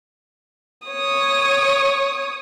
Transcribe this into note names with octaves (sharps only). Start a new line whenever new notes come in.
C#5 D#6